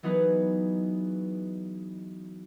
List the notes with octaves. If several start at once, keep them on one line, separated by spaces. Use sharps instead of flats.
E3 F#3 B3 D#4 G#4 B4